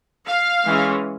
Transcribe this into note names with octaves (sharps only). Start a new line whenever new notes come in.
F5
E3 G#3 C#4